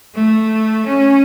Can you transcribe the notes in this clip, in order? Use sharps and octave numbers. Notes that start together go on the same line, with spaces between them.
A3
C#4